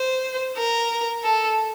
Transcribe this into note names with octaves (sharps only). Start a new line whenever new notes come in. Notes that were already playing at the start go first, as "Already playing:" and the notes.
Already playing: C5
A#4
A4